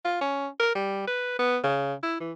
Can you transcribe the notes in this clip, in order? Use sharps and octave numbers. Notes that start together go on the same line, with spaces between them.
F4
C#4
A#4
G3
B4
B3
C#3
E4
E3